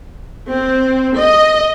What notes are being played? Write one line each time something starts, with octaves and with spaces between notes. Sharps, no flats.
C4
D#5